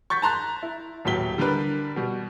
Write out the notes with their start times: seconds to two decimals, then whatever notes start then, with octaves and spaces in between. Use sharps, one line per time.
0.10 C#6 G6 A6 B6
0.22 A5 A#5 C6 F#6 A6
0.63 E4
1.05 D#1 A2 E3 F#3 B6 G7
1.38 D3 G3 D4 A#4 B4
1.96 B2 G3